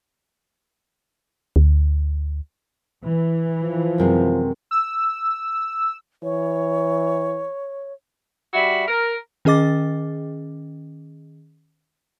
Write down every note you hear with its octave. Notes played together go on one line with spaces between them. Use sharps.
D2
E3
F3
F#2 C3 G#3
E6
E3 C#5
G3 F#4 E5 B5
A#4
D#3 C#4 G#4 D#5 D6 A6